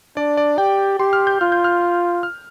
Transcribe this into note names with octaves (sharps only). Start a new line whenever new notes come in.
D4 D5
D5
G4 G5
G4 C6
F6
G6
F4 F6
G6
F6
F6